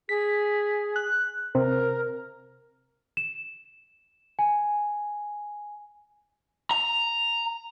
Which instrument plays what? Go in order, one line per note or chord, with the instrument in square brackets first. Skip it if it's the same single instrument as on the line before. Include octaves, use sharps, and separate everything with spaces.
[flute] G#4 [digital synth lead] B6
[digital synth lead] F#6
[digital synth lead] C3 [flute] A#4
[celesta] E7
G#5
[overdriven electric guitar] A#5